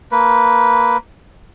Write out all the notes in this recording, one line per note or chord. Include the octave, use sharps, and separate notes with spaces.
A#3 B4